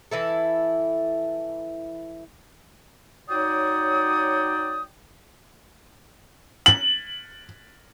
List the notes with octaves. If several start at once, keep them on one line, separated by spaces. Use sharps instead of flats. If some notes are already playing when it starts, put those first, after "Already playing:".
E3 E4 A4
F#3 D#4 C#5 D5 G5 D#6
F#7